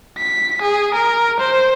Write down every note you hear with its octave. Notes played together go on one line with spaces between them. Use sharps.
B6
G#4
A#4
C5